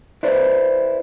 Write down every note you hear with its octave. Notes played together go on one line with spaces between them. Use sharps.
E4 B4 C5 D5